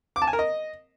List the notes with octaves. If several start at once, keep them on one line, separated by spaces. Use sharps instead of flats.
D6
A5
G#5
A#4
D#5